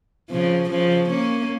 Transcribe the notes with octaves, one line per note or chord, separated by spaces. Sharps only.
C#3 F3
C#3 F3
A#3 C#4